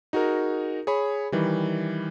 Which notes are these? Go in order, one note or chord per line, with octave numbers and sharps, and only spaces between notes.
D#4 F#4 G#4 A#4
G#4 C#5 B5
D#3 E3 G3